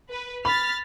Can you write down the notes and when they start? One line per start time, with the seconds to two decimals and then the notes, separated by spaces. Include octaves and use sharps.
0.11 B4
0.45 B5 F6 A6 B6